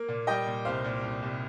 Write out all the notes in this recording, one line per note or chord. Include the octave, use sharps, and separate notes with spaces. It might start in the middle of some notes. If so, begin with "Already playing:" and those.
Already playing: A#3
A#2
G3 D#5 G5
A#2
C2 C5 F5
A#2
C2
C2